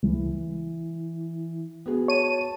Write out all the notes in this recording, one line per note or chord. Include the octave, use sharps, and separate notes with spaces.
C#2 E3
B3 F#4 G#4
C#5 A5 D#7